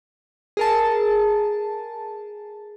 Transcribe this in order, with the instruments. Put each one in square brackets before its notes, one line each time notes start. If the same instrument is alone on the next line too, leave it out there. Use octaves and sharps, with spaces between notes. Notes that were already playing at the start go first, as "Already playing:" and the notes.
[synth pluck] G#4 A#4 A5